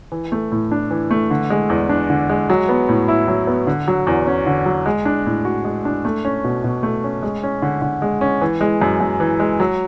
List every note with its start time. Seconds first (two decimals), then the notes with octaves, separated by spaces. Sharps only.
0.12 E3
0.32 A3
0.52 A2
0.72 D4
0.91 E3
1.11 A3
1.31 D3
1.50 G#3
1.69 E2
1.89 D4
2.10 D3
2.29 G#3
2.50 F#3
2.69 B3
2.89 A2
3.08 E4
3.28 F#3
3.47 B3
3.67 D3
3.88 F#3
4.07 E2
4.27 C#4
4.47 D3
4.66 F#3
4.86 G#3
5.05 D4
5.26 A2
5.45 F#4
5.65 G#3
5.85 D4
6.05 A3
6.25 C#4
6.44 B2
6.64 B2
6.83 A3
7.04 C#4
7.22 G#3
7.43 C#4
7.62 D3
7.82 D3
8.02 G#3
8.21 C#4
8.42 E3
8.61 G#3
8.82 F#2
9.01 F#2
9.20 E3
9.40 G#3
9.60 F#3